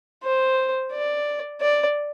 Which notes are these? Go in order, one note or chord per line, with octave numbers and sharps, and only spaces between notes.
C5
D5
D5